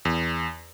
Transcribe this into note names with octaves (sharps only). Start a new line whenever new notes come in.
E2